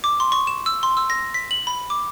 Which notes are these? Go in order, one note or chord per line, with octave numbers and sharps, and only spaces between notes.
D6
C6
C#6
E7
E6
C6
E6
A#6
B6
F#7
B5
D6